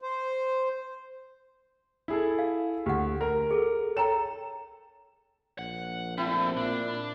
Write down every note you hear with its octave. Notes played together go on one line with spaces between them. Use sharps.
C5
E4 G#4 A4
F5
D2 G4 F#5
A#4
G#4 A4
A4 C#5 G5 A#5 E7
A#1 F#5
G3 A3 C4 E4
A#2 D4